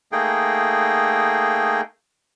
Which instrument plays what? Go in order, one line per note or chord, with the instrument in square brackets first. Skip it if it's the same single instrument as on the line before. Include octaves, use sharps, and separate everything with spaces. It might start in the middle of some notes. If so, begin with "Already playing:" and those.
[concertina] A3 A#3 D#4 G#4 G5